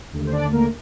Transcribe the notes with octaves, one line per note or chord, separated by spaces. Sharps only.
D#2 D3 A3
C5
D4 D5
A#3 A#4